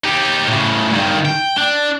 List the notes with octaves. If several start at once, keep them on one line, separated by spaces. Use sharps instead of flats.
D#4 G4
A2 C#3
G2 D#3
G5
D4